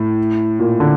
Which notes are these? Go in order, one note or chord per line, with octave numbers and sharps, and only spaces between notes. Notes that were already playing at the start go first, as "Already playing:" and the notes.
Already playing: A2
A#2
D3